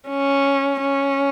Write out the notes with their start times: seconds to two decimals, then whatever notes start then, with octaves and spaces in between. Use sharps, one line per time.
0.09 C#4
0.81 C#4